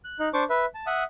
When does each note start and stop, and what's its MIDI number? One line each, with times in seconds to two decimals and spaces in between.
0.05 0.18 90
0.19 0.29 63
0.19 0.29 90
0.34 0.44 62
0.34 0.44 72
0.34 0.44 85
0.34 0.44 86
0.50 0.66 71
0.50 0.66 76
0.75 0.86 81
0.87 1.04 76
0.87 1.04 78
0.87 1.04 87